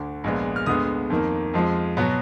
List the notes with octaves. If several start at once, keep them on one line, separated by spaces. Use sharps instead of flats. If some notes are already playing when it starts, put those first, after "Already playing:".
Already playing: D2 D3
A#1 A#2 G#3 B3
F6
D2 D3 G#3 B3 D#6
F2 D#3 A#3
F2 F3 G#3
B2 F#3 B3